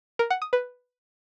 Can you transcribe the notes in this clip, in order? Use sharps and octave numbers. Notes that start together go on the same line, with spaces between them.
A#4
F#5
D#6
B4